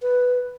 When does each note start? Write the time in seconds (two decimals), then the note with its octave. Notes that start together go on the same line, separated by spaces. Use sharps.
0.02 B4